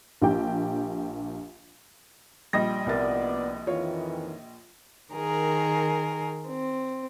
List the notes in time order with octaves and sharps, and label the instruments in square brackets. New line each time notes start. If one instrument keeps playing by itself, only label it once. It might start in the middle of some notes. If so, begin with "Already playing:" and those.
[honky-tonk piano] A#1 D4 G4 G5
[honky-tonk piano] A#1 D#5 A#6 [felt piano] G3
[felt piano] C2 A#4 A6 [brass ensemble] B3 D5
[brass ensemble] F2 D#3 E3 [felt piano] F4 C#5
[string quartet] D#3 G#4 A#4
C4